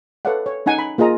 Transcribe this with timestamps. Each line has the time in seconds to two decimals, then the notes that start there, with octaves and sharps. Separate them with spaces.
0.25 A4 B4 C#5 D5 F5 F#5
0.46 C#5
0.66 C#4 D#4 F#5 G#5
0.79 B5
0.98 A#3 F4 G#4 D#5 A#5